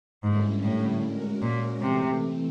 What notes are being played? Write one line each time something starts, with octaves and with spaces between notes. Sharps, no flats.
G#2 D3 G3 A#3 C#4 E4
A2
G#3 C#4 F#4 A#4
A#2
C3 E3 A3 C4